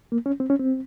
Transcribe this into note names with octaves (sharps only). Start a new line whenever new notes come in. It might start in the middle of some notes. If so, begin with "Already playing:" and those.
A#3
C#4
C4
C#4
C4